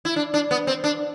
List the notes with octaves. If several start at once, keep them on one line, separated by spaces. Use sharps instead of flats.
E4
D4
D4
B3
C4
D4